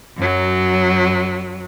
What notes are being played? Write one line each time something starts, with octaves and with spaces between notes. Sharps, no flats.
F#2 F#3